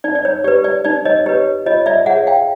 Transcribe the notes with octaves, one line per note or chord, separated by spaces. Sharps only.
D#4 D5
D5
C#5
G4 B4 D5
D5
D#4 D5
C#5 D#5
G4 B4 C#5
F4 C#5 D#5
D5 E5
G#4 C#5 E5 F#5
F5 G5